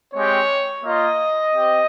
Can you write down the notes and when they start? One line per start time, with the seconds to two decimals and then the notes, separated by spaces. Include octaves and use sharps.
0.14 G#3 C4 G4 C#5
0.84 A#3 F4 D#5
1.54 C4 G4